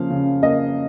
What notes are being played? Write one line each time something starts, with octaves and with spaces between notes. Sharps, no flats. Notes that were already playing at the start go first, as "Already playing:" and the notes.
Already playing: C#3 F3 A#3 F5
C#3
A#3 D#5